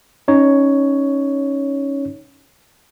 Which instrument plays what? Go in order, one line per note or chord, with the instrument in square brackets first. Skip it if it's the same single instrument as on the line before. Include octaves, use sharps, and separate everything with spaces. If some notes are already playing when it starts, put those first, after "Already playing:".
[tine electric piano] C#4 D#4 C#5